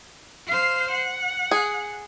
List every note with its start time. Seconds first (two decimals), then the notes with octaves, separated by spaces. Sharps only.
0.47 C5 F5
0.91 F#5
1.51 G#4